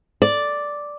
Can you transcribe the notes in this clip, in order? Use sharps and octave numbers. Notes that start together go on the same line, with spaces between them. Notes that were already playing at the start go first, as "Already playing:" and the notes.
D5